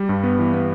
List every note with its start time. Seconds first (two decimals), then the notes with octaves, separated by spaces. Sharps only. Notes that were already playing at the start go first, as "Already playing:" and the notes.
Already playing: G3
0.09 G2
0.24 B3
0.39 E3
0.54 B3